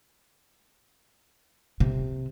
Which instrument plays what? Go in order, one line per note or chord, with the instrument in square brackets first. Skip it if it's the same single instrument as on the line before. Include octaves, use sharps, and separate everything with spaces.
[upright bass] C3